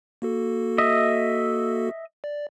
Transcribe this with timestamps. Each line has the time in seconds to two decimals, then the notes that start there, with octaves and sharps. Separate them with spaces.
0.22 A#3 F#4 A4
0.78 D#5 E5
2.24 D5